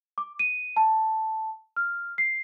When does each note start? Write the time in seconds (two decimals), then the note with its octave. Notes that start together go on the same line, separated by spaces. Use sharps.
0.18 D6
0.39 D#7
0.77 A5
1.76 F6
2.18 C7